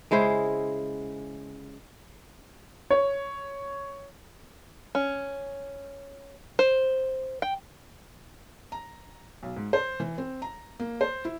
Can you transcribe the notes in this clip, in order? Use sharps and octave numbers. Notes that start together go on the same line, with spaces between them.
C#3 G#3 E4 C5
C#5
C#4
C5
G5
A#5
B1
G#2
C5
E3
C4
A#5
A#3
C5
E4